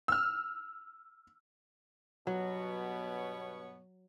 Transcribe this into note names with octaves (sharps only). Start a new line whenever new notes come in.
E6 F6
G2 B2 F#3 B3 C#5